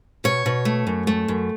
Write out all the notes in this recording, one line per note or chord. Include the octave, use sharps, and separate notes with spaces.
B2 C#5
B2
A3
F#2
A3
F#2